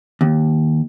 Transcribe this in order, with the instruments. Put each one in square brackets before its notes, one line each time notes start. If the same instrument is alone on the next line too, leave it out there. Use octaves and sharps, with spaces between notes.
[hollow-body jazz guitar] D#2